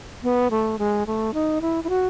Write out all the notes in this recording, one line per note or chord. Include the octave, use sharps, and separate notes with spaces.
B3
A3
G#3
A3
D#4
E4
E4
F#4